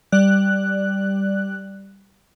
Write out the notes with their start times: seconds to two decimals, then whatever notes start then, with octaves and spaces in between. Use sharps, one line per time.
0.12 G3 D5 F#6